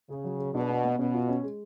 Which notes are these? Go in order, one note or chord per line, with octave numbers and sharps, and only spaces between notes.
C#3 G#4
F#3
G#4
B2 D4
B3
B3
B2 C#4
F4
C#4
G#3